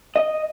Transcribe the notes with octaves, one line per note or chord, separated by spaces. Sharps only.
D#5